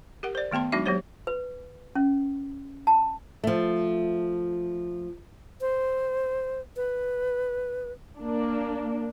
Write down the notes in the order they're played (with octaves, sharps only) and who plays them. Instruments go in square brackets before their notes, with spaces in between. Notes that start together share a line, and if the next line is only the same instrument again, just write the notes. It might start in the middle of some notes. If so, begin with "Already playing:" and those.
[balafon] G4 A#4 F#5
C5 D5
D#3 A3 B3 A5 C6
F#3 G#3 D4 D#4 F#4 E5
F#3 A#3 G4 C5 C#5
[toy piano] B4
C#4
A5
[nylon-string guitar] F3 A3
[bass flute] C5
B4
[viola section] A#3 D4